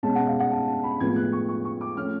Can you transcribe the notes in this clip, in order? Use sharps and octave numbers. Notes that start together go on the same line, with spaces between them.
B2 G#3 C#4 A5
F#5
F5
F#5
A5
A5
B5
A2 F3 G#3 B3 G#6
F#6
C#6
C#6
C#6
D6
F3 A3 C#4 F6